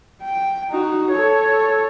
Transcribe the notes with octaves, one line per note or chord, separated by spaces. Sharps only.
G5
D#4 F#4
A4 C#5